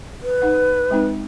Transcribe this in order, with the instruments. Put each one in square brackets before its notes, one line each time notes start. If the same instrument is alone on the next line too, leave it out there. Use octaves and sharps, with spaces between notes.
[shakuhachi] B4
[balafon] D#4 F#5
G#3 C4 D#4